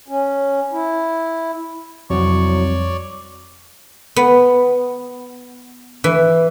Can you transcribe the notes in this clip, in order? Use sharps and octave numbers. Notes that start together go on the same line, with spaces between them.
C#4
E4
C2 F2 F#3 C#5 D5 C#6
B3
E3